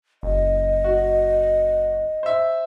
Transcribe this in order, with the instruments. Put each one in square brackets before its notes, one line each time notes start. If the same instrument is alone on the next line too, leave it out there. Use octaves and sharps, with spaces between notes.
[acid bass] F#1 [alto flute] D#5
[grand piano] F#4
C5 E5